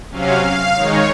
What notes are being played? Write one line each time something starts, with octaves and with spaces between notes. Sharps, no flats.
C3 F#3 C#4 F5
F5
D#3 G#3 D#4 C#5